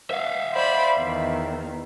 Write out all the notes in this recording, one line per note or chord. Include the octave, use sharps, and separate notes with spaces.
E5 F5
C5 D5 B5
E2 D#3